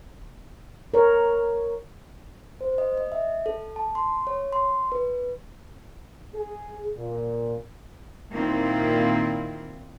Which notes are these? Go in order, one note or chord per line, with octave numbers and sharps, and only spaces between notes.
A#4 C#5
C5
D#5
D#5
E5
A4
A5
C6
C#5
C6
B4
G#4
A#2
A#2 D#3 A#3 C4 E4